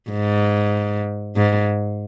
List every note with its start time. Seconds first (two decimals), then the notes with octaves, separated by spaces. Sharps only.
0.11 G#2
1.37 G#2